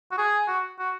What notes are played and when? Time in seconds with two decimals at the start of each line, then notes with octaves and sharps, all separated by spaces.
0.12 F#4
0.18 G#4
0.48 F#4
0.79 F#4